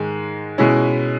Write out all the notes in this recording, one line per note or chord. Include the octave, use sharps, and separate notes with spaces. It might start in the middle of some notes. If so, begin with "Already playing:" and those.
Already playing: G#2 D#3 G#3
B2 G#3 C#4 E4